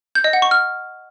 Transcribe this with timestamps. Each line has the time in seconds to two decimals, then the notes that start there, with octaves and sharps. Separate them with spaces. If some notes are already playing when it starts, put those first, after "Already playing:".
0.15 G6
0.24 D#5
0.33 F#5
0.42 C#6
0.51 F6